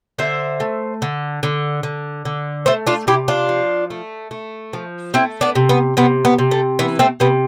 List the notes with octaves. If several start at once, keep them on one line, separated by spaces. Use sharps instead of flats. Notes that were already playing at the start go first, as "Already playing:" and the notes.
D3 C5 E5
A3
D3
D3
D3
D3
A3 C5 E5
D4 F4
C3 E4 G4
D4 F4
F3
A3
A3
F3
A3 C4 E4
B3 D4
C3
B3
C3 B3
B3
C3
A3
E3 B3
A3 C4
C3 B3